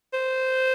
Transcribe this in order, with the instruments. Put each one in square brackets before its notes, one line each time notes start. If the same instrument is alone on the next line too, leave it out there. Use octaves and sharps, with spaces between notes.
[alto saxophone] C5